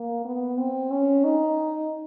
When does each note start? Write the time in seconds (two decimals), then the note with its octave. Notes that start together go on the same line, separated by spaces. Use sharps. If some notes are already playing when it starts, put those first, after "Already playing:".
Already playing: A#3
0.25 B3
0.58 C4
0.91 C#4
1.24 D#4